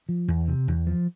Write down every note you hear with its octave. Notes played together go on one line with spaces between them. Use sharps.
F3
E2
C3
E2
F3